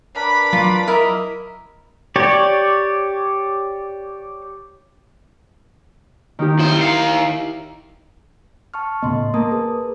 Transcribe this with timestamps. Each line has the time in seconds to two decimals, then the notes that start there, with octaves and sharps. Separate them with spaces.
0.16 D4 A#4 B4 B5 D6
0.53 F#3 F4
0.87 E4 A#4 D#5 E5
2.16 G4 C#5 D5
6.39 D#3 D#4 G4
6.59 F#2 D#4 E4 C5
6.78 D#3 F5
8.74 A5 C#6 F6
9.02 A2 C#3 B3 D#5 C6
9.34 A#3 A#4 A5 D#6
9.51 G#4 B4